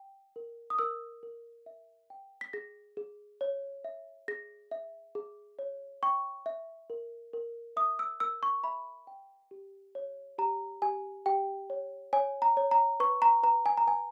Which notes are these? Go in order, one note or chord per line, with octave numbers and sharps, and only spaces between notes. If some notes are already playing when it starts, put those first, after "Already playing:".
Already playing: G5
A#4
D#6
A#4 E6
A#4
E5
G5
B6
G#4 A#6
G#4
C#5
E5
G#4 A#6
E5
G#4
C#5
G5 C#6
E5
A#4
A#4
E5 D#6
E6
A#4 E6
C#6
E5 B5
G5
G4
C#5
G4 A#5
G4 G#5
G4 G5
C#5
C#5 G#5
A#5
C#5
A#5
B4 C#6
A#5
B4 A#5
G#5
A#5
B4 G#5